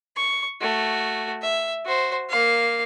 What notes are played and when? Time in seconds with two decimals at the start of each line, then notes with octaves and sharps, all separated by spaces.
0.17 C#6
0.61 A3 F#4
1.42 E5
1.86 F#4 C5
2.29 A#3 F5